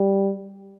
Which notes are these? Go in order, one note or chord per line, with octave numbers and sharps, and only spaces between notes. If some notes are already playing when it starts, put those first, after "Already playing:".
Already playing: G3